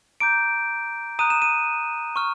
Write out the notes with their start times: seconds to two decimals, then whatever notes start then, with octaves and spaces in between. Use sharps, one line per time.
0.20 A#5 D6 G6 D7
1.19 A#5 D#6 F#6 D#7
1.30 E7
1.42 D#7
2.16 C#6 F6